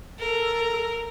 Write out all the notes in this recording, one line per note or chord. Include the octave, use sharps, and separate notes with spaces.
A4 A#4